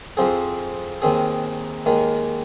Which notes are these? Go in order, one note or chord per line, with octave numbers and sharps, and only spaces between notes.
F2 F3 C4 G#4
D#2 D#3 C4 G#4
D#2 D#3 G#3